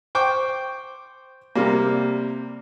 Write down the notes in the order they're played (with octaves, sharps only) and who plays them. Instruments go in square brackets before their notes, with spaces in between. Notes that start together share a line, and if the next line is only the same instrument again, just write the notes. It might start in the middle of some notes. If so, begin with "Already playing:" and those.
[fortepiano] C5 G5 C#6 D6
C3 G3 A#3